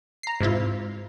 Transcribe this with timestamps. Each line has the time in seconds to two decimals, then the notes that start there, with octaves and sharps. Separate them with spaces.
0.23 A#5 C7
0.41 G#2 C3 E4 F4